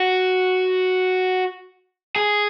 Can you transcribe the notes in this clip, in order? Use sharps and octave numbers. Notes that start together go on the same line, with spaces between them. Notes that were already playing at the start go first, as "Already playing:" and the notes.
Already playing: F#4
G#4